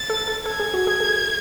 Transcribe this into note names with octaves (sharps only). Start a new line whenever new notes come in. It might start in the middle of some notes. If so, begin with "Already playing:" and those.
Already playing: A6
A4
A4
A4 G#6
G#4
F#4
G#4
A4